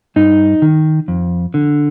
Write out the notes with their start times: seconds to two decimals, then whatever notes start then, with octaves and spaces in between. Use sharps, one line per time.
0.16 G2 D#4
0.62 D#3
1.08 F2
1.54 D3